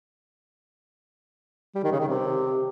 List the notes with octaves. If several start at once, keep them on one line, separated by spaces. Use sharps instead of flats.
G3
D#3
C#3
D#3
C3